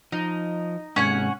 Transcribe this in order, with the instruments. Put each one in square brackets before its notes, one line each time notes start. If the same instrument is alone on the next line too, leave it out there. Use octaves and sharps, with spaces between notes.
[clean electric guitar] F3 [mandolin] D#4
[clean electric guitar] G#2 C3 G#3 [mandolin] C#4 F#5 G#5